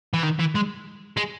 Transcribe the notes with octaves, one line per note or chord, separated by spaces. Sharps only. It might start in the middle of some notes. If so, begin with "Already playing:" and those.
E3
D#3
E3
G#3
G#3